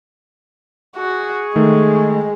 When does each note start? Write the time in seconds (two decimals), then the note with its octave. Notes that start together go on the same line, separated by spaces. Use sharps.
0.96 F#4 G#4 C#6
1.56 D#3 G#3 A3